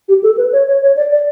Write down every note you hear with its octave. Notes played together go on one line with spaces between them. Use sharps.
G4
A4
B4
C#5
C#5
C#5
D5
D5